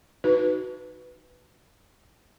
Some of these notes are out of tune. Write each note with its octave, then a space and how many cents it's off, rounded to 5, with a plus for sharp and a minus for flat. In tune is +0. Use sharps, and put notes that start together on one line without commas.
D#4 +0 F#4 +0 B4 +5